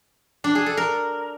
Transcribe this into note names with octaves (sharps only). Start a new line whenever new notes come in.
D4
G#4
A4
A#4